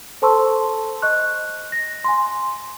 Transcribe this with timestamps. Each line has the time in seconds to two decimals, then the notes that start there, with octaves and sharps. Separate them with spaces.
0.22 A4 C5 A5 C6 C#6 E6
1.02 D#5 C#6 F#6
1.72 A#6
2.04 G#5 C6